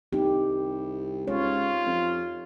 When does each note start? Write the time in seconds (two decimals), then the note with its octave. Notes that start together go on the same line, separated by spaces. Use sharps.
0.13 C2 D#4 G4
1.28 C#2 C4 F4 C#5
1.86 F2